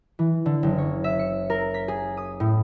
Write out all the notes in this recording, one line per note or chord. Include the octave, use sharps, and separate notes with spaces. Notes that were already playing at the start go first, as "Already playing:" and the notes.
E3
D3
F#1
C#5
E5
C#7
A#4
B6
G#4
D#6
A2